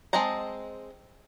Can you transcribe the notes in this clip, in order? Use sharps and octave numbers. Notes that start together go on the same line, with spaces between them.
G#3 C4 D#5 A5 A#5